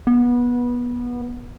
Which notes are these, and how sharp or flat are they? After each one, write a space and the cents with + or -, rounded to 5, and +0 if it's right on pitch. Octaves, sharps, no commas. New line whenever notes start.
B3 -20